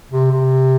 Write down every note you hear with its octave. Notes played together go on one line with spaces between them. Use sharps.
C3
C3